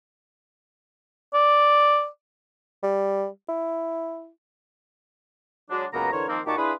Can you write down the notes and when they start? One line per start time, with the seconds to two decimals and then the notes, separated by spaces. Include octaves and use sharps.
1.34 D5
2.83 G3
3.49 E4
5.70 F#3 G#3 D4
5.93 C#2 F#2 C#3 A#3 B3 A#5
6.13 D3 E3 A#4 C5 C#5
6.29 D#3 F3 A#3 C4
6.46 A#2 D#4 F#4 G4 A5 D6
6.57 D4 E4 F4 G#4 B4